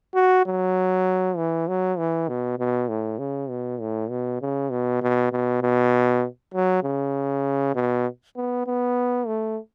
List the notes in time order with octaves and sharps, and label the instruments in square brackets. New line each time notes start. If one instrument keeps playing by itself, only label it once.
[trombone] F#4
F#3
E3
F#3
E3
B2
B2
A2
C#3
B2
A2
B2
C#3
B2
B2
B2
B2
F#3
C#3
B2
B3
B3
A3